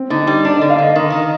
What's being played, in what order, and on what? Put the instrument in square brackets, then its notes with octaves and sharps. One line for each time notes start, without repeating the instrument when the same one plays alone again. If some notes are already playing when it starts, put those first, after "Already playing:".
Already playing: [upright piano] C4
[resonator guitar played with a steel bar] D3 [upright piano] D#4
[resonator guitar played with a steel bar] G3
[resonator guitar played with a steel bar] D4 [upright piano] D5
[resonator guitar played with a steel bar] D3 [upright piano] D#5
[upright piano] F5
[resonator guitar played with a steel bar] D3 [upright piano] D#5
[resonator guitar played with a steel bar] D#3
D#3